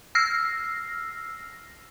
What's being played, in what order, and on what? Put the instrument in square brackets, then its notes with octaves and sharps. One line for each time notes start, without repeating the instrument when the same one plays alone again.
[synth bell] E6 F6 A#6 C7